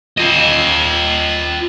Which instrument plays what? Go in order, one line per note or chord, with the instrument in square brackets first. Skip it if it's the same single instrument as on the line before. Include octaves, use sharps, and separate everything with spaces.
[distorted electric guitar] F4 D#5